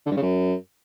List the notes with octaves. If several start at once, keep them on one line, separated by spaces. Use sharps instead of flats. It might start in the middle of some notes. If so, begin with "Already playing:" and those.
D3
G2
C#3
F#2